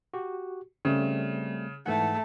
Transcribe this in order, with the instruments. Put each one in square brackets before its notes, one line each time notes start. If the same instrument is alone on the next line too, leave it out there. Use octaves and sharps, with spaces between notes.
[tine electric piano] F#4 G4
[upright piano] C#3 [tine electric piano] G3 A3 C4
[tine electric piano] G#2 E3 F#5 [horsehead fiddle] A3 A5